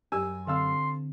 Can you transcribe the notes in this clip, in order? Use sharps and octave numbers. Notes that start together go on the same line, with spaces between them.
F#2 G4 G#5 E6
D3 C4 A4 F5 C6 E6